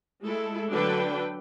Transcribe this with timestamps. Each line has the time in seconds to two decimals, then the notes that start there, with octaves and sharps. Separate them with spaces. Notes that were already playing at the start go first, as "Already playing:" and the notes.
0.23 G#3 A3 E4 A4
0.73 D3 F#3 D4 A4 B4 G5